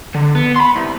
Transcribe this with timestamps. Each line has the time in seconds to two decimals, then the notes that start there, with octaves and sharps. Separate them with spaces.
0.14 D3
0.35 B3
0.56 B5 C6
0.76 C2